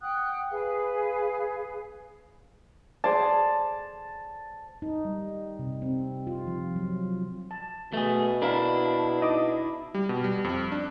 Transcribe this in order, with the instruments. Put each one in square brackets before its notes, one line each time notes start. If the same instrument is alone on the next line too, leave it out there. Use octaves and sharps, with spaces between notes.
[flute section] F#5 G5 D#6 F#6
G#4 B4 F5
[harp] G#4 C5 D5 [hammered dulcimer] A5
[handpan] D#4
G3
C3
C4
F4
F3
F#3
[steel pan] A5
[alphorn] B2 [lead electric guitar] A3 G#4
[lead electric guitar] D4 E4 [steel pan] A#4 F5 B5
[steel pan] D#4 D#5 D6
[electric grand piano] G3
B2
G3
F2
D4